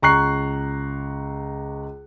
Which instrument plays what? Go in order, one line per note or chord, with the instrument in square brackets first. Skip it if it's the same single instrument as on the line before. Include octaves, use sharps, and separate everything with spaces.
[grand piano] C#2 A#5 C#6 F#6 C7